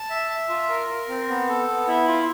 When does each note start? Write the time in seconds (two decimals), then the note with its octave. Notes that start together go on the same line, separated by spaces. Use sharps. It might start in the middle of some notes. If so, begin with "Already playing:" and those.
Already playing: A5
0.10 E5
0.30 E5
0.49 F4
0.69 A#4
0.89 A#4
1.09 C4
1.29 B3
1.48 A4
1.68 B3
1.88 E4
2.08 F4